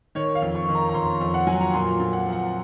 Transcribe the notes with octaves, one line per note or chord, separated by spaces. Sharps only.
D#3 C#5
F5
F2
C#6
D#3
A#5
A#5
F2 C6
F2
F#5
F#3 G#5
A#5
A#2 C6
A#2
F#5
F3
F#5